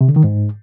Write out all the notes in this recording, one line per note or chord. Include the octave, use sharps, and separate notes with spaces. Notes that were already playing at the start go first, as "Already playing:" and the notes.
C3
D3
D#3
G#2